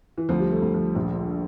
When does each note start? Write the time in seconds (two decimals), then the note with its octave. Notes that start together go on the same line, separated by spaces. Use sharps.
0.18 E3
0.29 D2 F3
0.40 G3
0.51 A3
0.62 D2
0.74 F3
0.95 A#1 F3